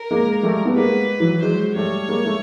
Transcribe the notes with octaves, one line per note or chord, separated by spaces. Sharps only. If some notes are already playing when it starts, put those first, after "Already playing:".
Already playing: A#4
G#3 A#3
G3 A3
B3
G#3 A#3 B4
E3 F#3
F#3 G#3 C5
G3 A3 C#5
G#3 A#3
A3